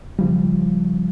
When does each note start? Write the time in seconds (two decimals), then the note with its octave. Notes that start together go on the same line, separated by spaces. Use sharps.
0.18 C#3 F3 G3